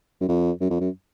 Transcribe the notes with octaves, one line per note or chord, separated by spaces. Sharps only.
F#2
F2
F#2
F2
F#2